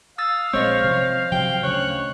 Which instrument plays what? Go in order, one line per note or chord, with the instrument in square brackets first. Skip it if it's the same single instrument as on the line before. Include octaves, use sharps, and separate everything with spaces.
[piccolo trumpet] F5 [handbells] D#6 E6 A6
[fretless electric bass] A#1 G#3 C4 [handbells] C5 D#5 [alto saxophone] C#5
[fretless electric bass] C3 F3 C4
[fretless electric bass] C3 F3 F#3 [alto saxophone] G5
[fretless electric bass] D2 C#3 [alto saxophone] C#5 [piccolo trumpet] F#6